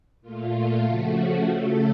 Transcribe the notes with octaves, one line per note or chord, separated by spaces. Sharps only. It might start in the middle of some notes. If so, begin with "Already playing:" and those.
A#2 A3 F4
C#3 F3 A3 F#4
A3 A4
C#3